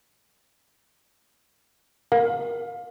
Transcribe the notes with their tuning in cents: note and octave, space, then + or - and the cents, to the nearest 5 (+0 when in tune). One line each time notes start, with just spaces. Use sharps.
A#4 +20 F5 +30